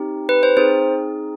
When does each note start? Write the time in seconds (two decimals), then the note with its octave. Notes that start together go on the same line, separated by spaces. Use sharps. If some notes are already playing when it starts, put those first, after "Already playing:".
Already playing: C4 D#4 G4
0.29 B4
0.43 C5
0.56 C4 D#4 G#4 C5